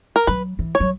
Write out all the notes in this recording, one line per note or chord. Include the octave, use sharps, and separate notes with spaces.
A#4
F#3 B4
E3
C#5
F#3